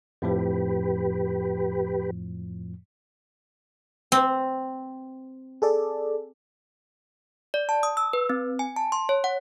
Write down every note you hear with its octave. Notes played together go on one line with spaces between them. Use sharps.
F2 A2 F3 G4 B4
C4
G#4 A4 D5
D5
A5
D#6
E6
B4
C4
G#5
A5
C6
C#5
F#5